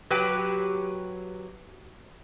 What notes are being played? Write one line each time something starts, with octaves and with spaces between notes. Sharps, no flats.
F#3 G4 B4 G5